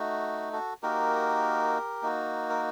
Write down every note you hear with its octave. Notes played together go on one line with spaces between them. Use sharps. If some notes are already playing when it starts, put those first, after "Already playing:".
Already playing: A3 D#4 F#4
F#4 A4
A#3 D#4 F#4 G4 A#4
A#3 D#4 F#4
A#4